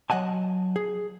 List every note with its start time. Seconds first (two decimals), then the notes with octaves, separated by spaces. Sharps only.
0.10 F#3 D#5 F#5 G#5 A5
0.76 G#4